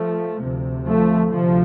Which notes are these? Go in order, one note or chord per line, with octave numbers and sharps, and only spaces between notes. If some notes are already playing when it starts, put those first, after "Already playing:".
Already playing: F3 A3
D2 C3
F3 A3
D2 C3 F3